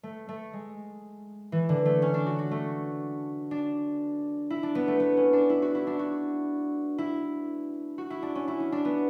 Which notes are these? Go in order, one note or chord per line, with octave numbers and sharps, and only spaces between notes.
A3
A3
G#3
E3
D3
A3
C#4
D4
F#4
F#4
A3
D4
E4
D4
B3
A3
B3
C#4
D4
E4
F#4
E4
D4
F#4
E4
F#4
E4
D4
C#4
E4
C#4
D4
B3